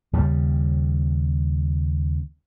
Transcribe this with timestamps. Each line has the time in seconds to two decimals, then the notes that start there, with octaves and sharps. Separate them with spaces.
0.13 D#2 C#3 G3